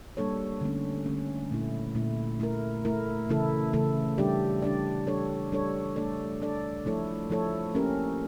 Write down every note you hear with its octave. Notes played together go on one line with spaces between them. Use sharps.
G3 A#3 D4 A4 C#5
D3 A3 C#4
D3 A3 C#4
A#2 A3 E4
A#2 A3 E4
A3 E4 A#4
A3 E4 A#4
C#3 E3 A3 E4 A4
C#3 E3 A3 E4 A4
G3 D4 G4 D5
G3 D4 G4 D5
G3 D4 A4 C#5
G3 D4 A4 C#5
A3 D4 A4 D5
A3 D4 A4 D5
F3 A3 E4 A4 C#5
F3 A3 E4 A4 C#5
A#3 C#4 G4 A#4